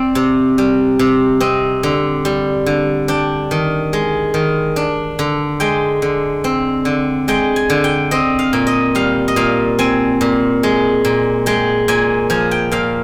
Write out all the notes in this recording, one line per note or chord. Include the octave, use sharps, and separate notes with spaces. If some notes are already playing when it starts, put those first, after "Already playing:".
Already playing: C4 D5
C3
G3
C3
C4 D#5
D3
G3
D3
D4 G5
D#3
G#3
D#3
D4
D3
G#3 G5
D3
C4
D3
G#3 G5
G#5
D3
G5
C4 D#5
F5
A#2
D#5
G3 F5
D#5
A#2 F5
C4 G#5
A#2
G#3
A#2
G#3 G5
A#2 G#5
F3 G#5
G5
A#2 F5